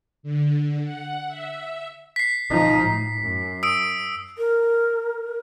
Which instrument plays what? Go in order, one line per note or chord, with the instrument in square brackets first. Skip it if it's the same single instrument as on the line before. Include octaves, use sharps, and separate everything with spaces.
[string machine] D3
F#5
E5
[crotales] B6 C7
[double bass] F3 D#4
A2
F#2
[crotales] D#6 E6 D7
[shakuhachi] A#4